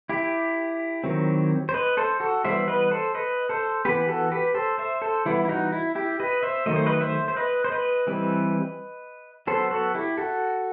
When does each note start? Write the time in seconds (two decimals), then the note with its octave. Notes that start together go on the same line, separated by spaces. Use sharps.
0.09 E4 G4
1.04 D#3 F#3 C4
1.69 C5
1.74 B4 D#5
1.97 A4 C5
2.20 F#4 A4
2.44 E3 G3 B3 C5 E5
2.68 B4 D#5
2.91 A4 C5
3.15 B4 D#5
3.49 A4 C5
3.85 E3 B3 G4 B4
4.08 F#4 A4
4.31 G4 B4
4.55 A4 C5
4.78 C5 E5
5.02 A4 C5
5.26 E3 G3 B3 E4
5.45 E4
5.49 D#4 F#4
5.72 E4
5.95 E4 G4
6.20 B4 D#5
6.43 C5 E5
6.66 D#3 F#3 A3 D#5
6.76 C5
6.86 B4 D#5
7.01 C5 E5
7.28 C5
7.37 B4 D#5
7.64 C5
7.72 B4 D#5
8.07 E3 G3 C4
9.47 F#3 B3 A4 C5
9.71 F#4 A4
9.94 E4 G4
10.17 F#4 A4